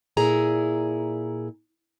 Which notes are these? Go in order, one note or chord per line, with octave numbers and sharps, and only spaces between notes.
A#2 E4 G#4 A#5